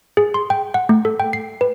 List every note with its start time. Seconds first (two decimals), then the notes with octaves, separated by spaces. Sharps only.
0.17 G#4
0.34 C6
0.50 G5
0.74 F#5
0.89 A3
1.05 A4
1.20 G5
1.33 C7
1.61 B4